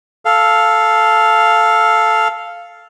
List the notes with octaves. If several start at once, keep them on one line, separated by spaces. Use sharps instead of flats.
A4 F5